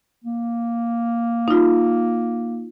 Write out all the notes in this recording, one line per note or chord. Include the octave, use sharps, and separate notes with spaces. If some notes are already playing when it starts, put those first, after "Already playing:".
A#3
D#4 F4